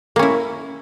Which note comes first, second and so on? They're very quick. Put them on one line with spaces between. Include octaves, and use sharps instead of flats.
A#3 C#4 E4